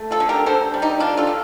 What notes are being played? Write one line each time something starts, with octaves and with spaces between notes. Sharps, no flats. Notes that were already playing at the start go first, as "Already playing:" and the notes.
Already playing: A3
F4 A4
D3
G4 A#4
D3 A4 C5
G3
D#4 G4
D3 D4 F4
F4 A4
D3